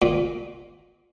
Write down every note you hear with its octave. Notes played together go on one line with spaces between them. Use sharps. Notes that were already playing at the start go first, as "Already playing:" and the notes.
A#2